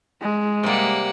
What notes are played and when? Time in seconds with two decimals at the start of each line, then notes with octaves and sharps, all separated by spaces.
0.21 G#3
0.63 C3 G3 A#3 F#5